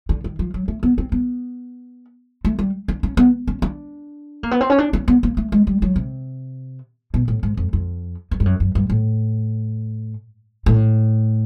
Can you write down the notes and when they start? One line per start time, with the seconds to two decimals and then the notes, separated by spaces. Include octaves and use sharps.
0.09 D3
0.24 D#3
0.39 F3
0.54 F#3
0.68 A3
0.83 B3
0.98 C4
1.12 B3
2.45 A3
2.59 G3
2.88 D4
3.03 C#4
3.17 B3
3.47 C#4
3.62 D4
4.43 A#3
4.51 B3
4.61 C4
4.70 C#4
4.78 D4
4.93 C#4
5.08 B3
5.23 A#3
5.37 A3
5.52 G#3
5.67 G3
5.82 F#3
5.96 C3
7.14 B2
7.28 A2
7.43 G#2
7.57 F2
7.73 F2
8.31 F2
8.40 G2
8.45 F#2
8.60 F#2
8.75 G2
8.90 A2
10.66 A2